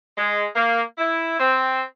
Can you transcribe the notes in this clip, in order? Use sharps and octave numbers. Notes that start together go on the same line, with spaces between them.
G#3
A#3
E4
C4